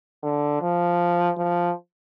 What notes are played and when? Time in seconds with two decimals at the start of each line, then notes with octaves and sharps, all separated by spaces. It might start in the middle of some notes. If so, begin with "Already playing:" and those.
0.23 D3
0.61 F3
1.37 F3